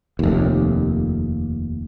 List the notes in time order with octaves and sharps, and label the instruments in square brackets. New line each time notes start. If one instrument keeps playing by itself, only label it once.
[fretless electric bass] F1 D#2